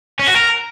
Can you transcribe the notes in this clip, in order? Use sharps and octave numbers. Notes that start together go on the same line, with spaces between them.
C#4
F#4
A#4